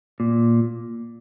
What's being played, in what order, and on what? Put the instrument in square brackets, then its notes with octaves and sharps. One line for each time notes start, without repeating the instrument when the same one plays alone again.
[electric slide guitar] A#2